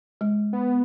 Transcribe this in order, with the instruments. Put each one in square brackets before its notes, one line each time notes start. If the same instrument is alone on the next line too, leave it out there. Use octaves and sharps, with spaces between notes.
[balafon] G#3
[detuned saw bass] B3